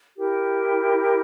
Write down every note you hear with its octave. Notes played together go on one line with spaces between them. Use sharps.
E4 G4 A#4